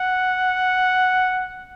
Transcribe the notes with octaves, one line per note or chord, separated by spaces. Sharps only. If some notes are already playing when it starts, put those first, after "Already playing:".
Already playing: F#5